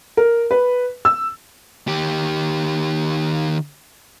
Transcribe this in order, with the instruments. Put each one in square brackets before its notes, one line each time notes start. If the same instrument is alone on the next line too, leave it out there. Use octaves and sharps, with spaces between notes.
[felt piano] A#4
B4
E6
[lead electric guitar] D#3 G4